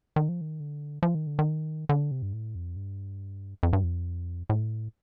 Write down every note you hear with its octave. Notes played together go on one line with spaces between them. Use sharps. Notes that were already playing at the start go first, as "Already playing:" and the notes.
D#3
F3
D#3
D3
F3
D#3
D3
D#3
D3
C3
G2
A2
F2
G2
F2
G2
F2
A2